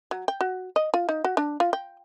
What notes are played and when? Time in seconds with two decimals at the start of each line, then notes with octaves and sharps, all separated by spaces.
0.11 F#3
0.28 G5
0.41 F#4
0.76 D#5
0.94 F4
1.09 D#4
1.24 F#4
1.37 D4
1.60 F4
1.73 G5